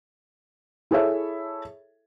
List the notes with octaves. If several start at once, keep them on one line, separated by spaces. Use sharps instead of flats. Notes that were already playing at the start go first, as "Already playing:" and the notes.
E4 G#4 A4 C#5 E5